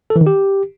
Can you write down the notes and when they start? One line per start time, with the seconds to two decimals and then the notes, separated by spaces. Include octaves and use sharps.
0.10 A4
0.16 E3
0.21 D#3
0.27 G4